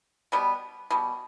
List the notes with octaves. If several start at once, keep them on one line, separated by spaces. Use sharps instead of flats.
B2 G3 B3
B2 G3